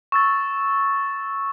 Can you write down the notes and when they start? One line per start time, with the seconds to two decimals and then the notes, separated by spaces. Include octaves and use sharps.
0.12 C#6 E6 A6